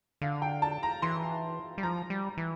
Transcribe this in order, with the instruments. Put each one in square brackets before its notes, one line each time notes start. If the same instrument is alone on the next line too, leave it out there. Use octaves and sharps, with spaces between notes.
[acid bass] D3 [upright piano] F5
[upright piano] G5
A5
A#5
[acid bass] E3 [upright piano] C6
[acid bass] G3
[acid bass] F3 [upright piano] A#5
[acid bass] G3
E3